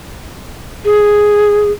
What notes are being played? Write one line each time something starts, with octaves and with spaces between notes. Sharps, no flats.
G#4